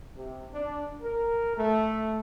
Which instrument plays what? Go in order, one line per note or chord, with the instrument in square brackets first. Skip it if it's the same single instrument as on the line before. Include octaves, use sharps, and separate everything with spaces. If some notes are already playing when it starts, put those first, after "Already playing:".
[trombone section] C3
D4
A#4
A3